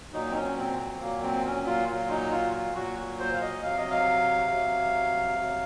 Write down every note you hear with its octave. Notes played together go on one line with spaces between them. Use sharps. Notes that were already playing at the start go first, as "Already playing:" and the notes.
A#2 F#3 D#4
C4
C#4
C4
C4
A#2 F#3 A#3
C4
C#4
F4
A#2 F#3 F4
D#4
F4
F4
A#2 F#3 F#4
C5
F5
D#5
C3 F#3 F5
D#5
F5
C3 F#3
C3 F#3